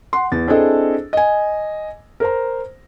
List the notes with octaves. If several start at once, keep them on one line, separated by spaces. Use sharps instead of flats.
F#5 C6
E2 A6
C4 D4 E4 G#4 A4 D#5
D#5 G#5
A#4 C5 A#5